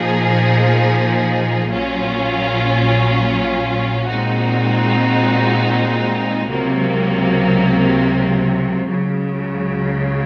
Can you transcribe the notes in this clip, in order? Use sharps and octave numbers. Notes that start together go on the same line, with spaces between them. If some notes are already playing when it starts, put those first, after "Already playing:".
Already playing: A#2 F3 A#3 D#4 G#4
A#1 A#2 F#3 C#4 F4
A#2 G#3 C4 D#4 F#4
C#2 C3 F#3 A#3
C#2 C#3 F#3